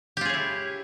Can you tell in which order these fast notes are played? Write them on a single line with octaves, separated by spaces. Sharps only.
G4 F4 G#4 C#5 E4